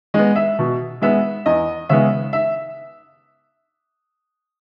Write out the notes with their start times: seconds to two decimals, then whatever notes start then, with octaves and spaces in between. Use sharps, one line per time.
0.14 G#3 B3 D#5
0.36 E5
0.59 B2
1.02 G#3 B3 E5
1.46 E2 D#5
1.89 C#3 G#3 B3 E5
2.33 E5